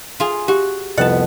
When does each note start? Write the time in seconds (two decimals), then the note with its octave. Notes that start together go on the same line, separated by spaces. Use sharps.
0.20 F4 G#4
0.48 F#4 G4
0.98 C2 F2 B3 D#5 F#5 A5